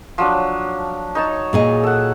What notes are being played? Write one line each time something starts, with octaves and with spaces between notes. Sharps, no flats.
F3 F#3 D4
D#4 C#5 A5
A#2 G#4 D#5
A4 F#5